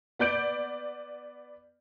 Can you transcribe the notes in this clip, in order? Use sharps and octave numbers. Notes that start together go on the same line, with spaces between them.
B3 D5 G6 D7 F#7